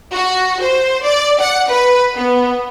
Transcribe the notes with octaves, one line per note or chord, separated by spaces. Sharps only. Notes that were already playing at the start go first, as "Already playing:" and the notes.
F#4
C5
D5
F#5
B4
B3